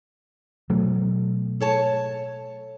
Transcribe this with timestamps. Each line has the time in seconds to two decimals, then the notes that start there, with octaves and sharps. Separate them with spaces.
0.70 B2 F#3 A3
1.60 A4 C#5 A5